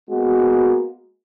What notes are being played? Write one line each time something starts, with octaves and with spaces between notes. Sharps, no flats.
G#3 A#3 B3 F#4